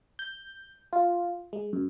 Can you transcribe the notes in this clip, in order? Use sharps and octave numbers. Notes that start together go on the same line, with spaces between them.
G6
F4
G#3
F#2